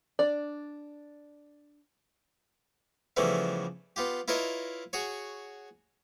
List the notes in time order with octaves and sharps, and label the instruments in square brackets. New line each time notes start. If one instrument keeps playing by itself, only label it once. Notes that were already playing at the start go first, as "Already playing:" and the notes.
[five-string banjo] D4 D5
[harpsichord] C#3 E3 F3 G3 A3 B3
B3 F4 G4
E4 F4 A#4 B4 C#5 D#5
F#4 G#4 C#5